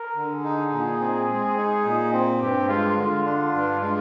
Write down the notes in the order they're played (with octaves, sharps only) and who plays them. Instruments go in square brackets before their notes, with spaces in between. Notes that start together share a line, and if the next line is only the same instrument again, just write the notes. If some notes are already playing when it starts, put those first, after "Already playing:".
Already playing: [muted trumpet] A#4
[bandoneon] D3
[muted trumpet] G#4
[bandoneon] D#4
A#2
C4
G#3
D#4
A#2
C4
[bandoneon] G2 [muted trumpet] G4
[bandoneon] G#3 [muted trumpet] F4
[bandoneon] D3 [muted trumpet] F4
[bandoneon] D4
G2
G#3